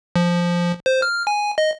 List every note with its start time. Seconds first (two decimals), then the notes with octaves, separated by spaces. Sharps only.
0.16 F3
0.86 C5
1.02 F6
1.27 G#5
1.58 D#5